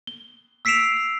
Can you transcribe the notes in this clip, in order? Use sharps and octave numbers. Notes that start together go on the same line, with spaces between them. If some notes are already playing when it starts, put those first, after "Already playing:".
G7
E6 B6 C7 D7 E7 F7